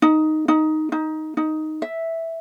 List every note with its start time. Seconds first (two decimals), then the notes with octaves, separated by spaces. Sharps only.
0.02 D#4
0.48 D#4
0.92 D#4
1.37 D#4
1.82 E5